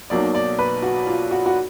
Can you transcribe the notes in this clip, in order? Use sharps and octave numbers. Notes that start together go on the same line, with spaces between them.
B1 B2 F#3 A#3 D#4 D5
D5
B4
F#4
F4
F#4
F#4